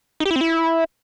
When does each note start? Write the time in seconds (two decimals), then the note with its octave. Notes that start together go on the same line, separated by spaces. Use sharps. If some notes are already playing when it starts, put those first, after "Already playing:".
0.20 D#4
0.26 G4
0.31 E4
0.36 C4
0.41 E4